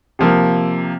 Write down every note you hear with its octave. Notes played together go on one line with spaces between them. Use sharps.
C3 F3 A#3